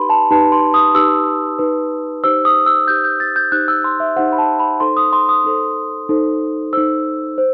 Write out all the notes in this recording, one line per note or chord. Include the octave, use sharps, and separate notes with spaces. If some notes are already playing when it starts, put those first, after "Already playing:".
Already playing: D#4 G4 B4 B5 C6
A5
D#4 G4 B4 A5
C6
D#6
D#4 G4 B4 E6
D#4 G4 B4
D#4 G4 C5 E6
D#6
E6
D#4 G4 C5 G6
G6
A6
G6
D#4 G4 C5 F#6
E6
C6
E5
D#4 G4 C5 F#5
B5
A5
B5
D#4 A4 C5 C6
D#6
C6
D#6
D#4 A4 C5
D#4 A4 C5
D#4 A4 C5 E6
C5